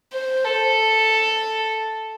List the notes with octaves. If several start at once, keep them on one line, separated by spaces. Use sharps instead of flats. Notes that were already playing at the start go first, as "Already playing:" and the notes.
C5
A4